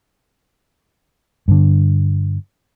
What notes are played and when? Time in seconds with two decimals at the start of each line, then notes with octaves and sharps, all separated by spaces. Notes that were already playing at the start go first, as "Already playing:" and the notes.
1.48 G2 D3